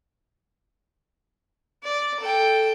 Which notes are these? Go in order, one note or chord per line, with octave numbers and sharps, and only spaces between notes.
D5
A4 G5